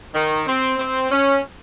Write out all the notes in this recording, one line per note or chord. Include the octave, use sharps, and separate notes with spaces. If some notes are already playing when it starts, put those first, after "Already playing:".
D#3
C4
C4
C#4